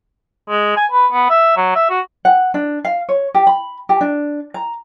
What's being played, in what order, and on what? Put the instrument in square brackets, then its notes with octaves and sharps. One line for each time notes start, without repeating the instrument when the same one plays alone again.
[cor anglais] G#3
G#5
B4
B3
E5
F#3
E5
F#4
[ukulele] F#5
D4
F5
C#5
G4
B5
G4
D4
A#5